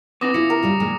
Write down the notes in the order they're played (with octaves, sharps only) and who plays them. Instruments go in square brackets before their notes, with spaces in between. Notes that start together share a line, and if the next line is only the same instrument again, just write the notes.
[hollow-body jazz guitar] B3 C4 D#4 [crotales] D6 D#6 A#6
[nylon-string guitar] C#3 B3 F4 [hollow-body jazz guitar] E4 [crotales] C#7
[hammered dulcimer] A#4
[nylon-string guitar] C#3 G3 F4
[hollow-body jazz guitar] A#2 [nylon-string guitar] D#3 G#3